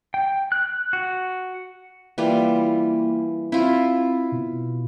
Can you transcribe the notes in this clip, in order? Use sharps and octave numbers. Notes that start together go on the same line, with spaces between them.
G5
F#6
F#4
E3 G3 A#3 F4
C4 E4 F4
B2